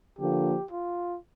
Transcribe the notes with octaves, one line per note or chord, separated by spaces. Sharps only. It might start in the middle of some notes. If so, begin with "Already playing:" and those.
D3 F3 A#3 G4
F4